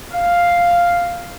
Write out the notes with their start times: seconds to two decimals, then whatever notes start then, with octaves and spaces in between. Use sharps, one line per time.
0.13 F5